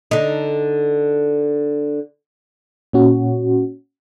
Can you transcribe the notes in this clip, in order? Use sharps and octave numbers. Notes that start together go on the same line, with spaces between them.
D3 D#4
A#2 C#4 F#4